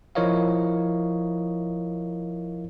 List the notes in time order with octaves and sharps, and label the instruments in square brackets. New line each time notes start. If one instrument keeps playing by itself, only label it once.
[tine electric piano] F3 E4 A#4 C#5 D#5 F5